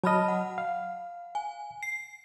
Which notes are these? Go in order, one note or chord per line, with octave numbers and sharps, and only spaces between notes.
F#3 D#5 A5 B5 F6
F#5
F5
G#5
C7